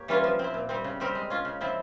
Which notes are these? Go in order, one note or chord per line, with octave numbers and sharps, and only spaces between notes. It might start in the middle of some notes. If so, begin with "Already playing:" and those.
Already playing: A#3 G4 C#5
E3 G3 C#4 F4
F3
C4 E4
A#2
G3 C4
C#3
G3 C4 G4 A#4
G#3
C#4 F4
C#3
F3 C4 E4